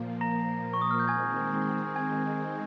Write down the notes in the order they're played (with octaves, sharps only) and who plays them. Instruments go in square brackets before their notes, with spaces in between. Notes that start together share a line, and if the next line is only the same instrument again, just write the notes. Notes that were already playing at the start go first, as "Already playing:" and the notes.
Already playing: [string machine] A#2 F3 A#3
[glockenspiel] A#5 A#6
C#6
D#6
F6
G6
[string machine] D#3 G#3 C4 [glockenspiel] G#5 G#6
[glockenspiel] G#5 G#6